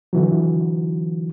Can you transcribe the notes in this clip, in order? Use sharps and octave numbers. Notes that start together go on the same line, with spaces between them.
D3 E3 F#3